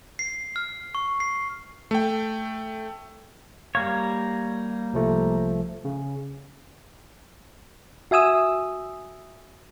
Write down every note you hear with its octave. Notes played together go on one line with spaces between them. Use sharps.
C7
F6
C#6
C7
A3 G5
G3 A#3 C#5 F5
C2 F3 A3
C#3
F#4 E5 G#5 D#6 E6